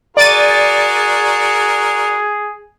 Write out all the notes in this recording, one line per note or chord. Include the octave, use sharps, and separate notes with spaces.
F#4 G#4 A#4 D5 A6 D#7